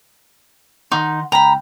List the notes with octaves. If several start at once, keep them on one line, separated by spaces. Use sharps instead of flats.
D#3 D#4 F#5 C6
C#2 G5 A#5 B5